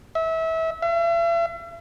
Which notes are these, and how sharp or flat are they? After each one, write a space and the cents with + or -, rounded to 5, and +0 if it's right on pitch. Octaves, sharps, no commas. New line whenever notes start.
E5 -25
E5 +45